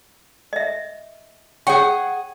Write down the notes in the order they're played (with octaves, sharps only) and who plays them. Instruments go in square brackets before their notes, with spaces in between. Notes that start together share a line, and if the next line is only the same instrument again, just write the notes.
[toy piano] D#5 E5
[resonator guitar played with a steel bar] G#4 F#5 [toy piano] C#5 G5 C#6